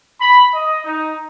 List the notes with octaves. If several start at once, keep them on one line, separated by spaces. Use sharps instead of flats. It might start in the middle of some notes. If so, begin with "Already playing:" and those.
B5
D#5
D#4